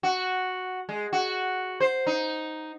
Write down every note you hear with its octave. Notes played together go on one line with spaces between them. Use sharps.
F#4
G#3
F#4
C5
D#4